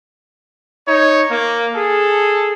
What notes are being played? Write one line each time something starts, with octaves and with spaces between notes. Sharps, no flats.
D#4 C#5
A#3
G#4 A4